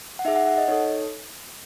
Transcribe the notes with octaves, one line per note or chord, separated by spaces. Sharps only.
F#5
D#4 G#4 E5
F#5
F#5
D#5
D#4 A4 C#5